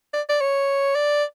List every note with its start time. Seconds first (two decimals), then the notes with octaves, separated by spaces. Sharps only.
0.14 D5
0.29 D5
0.41 C#5
0.95 D5